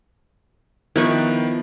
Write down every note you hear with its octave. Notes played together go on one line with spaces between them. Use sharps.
D#3 F3 B3 E4 B4 C#6